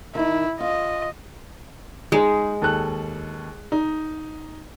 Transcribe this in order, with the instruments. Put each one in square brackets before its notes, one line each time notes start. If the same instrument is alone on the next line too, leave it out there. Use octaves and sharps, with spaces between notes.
[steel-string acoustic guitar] D#3 D#4 [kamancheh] E4
[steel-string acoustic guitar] F4 [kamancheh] D#5
[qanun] G#3 [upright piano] D#4 G#4
[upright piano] D#2 A4 F#6
D#4